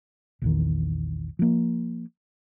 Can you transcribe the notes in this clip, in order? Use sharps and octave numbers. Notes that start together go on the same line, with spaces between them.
A#1 E2 D#3
F3 A#3